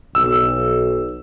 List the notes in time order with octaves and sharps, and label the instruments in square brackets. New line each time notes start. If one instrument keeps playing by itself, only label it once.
[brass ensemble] B1 [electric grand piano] E6